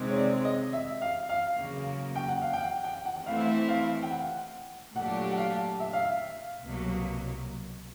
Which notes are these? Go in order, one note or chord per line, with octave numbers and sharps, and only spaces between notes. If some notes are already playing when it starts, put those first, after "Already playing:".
Already playing: C3 D#3 G#3 C4
C#5
D5
D#5
E5
F5
F5
E2 C#3 F#3 A#3
G5
F#5
F5
G5
F#5
G5
F#5
F#5
E3 A3 C4 E4 F5
F5
G5
F#5
A#2 F#3 A3 D4 G4 F#5
F#5
F5
E5
F5
E5
C2 B2 F#3 A#3